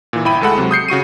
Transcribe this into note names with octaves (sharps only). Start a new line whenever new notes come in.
A#2 E3
G1 E4 G5 B5 D#7
D2 G#3 A4 F#5 B5
C3 F#3 G#3
D#6 G6 C7 C#7
C#3 F#4 C#6 D#7